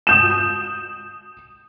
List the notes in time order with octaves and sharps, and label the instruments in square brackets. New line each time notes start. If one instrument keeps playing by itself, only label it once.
[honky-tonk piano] D#6 G6 E7